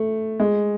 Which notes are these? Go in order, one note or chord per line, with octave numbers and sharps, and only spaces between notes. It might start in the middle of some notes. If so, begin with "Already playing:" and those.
Already playing: A3
G#3